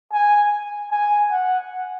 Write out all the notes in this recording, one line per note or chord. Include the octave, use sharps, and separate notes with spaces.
G#5
G#5
F#5